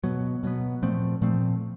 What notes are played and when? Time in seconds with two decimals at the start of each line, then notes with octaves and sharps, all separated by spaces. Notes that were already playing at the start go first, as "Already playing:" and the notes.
0.04 B2 F#3 B3
0.43 B2 F#3 B3
0.83 A#2 F3 A3 C4
1.22 A#2 F3 A3 C4